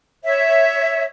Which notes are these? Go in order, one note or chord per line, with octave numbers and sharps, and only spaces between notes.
C#5 E5